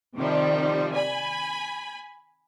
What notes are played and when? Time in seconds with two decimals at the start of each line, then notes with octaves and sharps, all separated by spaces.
0.16 C3 D#3 F3 G3
0.94 G#5 B5